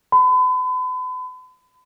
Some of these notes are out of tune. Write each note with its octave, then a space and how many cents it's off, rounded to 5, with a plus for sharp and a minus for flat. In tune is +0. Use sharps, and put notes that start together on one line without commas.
B5 +40